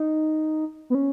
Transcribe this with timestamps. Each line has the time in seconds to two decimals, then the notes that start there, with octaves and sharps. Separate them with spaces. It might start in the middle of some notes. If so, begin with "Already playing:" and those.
Already playing: D#4
0.90 B3
0.95 C#4